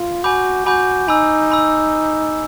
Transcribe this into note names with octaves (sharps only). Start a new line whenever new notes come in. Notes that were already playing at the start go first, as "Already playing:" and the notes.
Already playing: F4
F#4 G#5 B5 D6 G6
F#4 G#5 B5 D6 G6
D#4 G#5 B5 E6
G#5 B5 E6